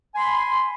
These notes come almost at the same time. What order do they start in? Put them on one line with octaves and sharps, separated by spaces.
G#5 C6 B5